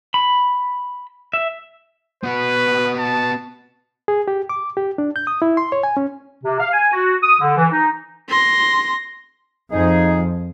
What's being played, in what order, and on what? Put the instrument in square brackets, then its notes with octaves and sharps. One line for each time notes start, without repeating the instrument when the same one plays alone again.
[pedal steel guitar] B5
E5
[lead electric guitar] B3 F#4 [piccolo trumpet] B4
[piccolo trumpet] A5
[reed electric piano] G#4
G4
D6
G4
D4
G6
D#6
E4
C6
C#5
G#5
C#4
[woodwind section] C3
F5
G#5
F#4
D#6
D3
E3
D#4
[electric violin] C6 A#6
[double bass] F2 F3 [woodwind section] D#4 G#4